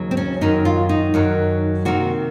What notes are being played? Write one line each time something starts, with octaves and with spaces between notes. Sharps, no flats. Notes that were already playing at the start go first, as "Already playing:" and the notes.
Already playing: D#2 C#3 F#3
C4
C#4
F#2 D#3 F#3 D#4
F4
D#4
F#2 D#3 F#3
C3 D#3 A#3 F#4